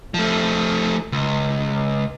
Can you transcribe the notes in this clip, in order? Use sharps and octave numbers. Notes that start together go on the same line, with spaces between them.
F3 A3
C#2